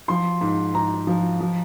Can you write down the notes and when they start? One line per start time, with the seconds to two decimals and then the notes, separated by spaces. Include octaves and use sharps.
0.08 F3 C6
0.41 G#2
0.74 G#2 A#5
1.07 F3
1.40 F3